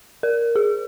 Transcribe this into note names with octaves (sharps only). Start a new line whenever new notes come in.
A#4
G#4